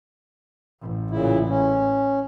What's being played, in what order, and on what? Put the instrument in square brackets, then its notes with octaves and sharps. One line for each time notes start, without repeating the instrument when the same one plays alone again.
[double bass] A1
[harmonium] A#2 C#3 E4
C#4